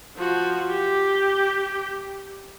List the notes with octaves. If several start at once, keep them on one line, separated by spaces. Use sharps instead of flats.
F3 F#4
G4